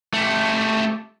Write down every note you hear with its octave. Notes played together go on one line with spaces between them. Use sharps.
A3 G4